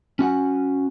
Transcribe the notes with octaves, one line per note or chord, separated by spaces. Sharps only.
C#4 F#4 F#5 G#5